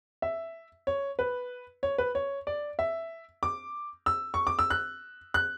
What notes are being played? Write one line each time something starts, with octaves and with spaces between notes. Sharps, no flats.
E5
C#5
B4
C#5
B4
C#5
D5
E5
D6
E6
C#6
D6
E6
F#6
F#6